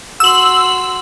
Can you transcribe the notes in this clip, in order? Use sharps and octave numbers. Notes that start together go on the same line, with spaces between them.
F#4 C6 E6 F#7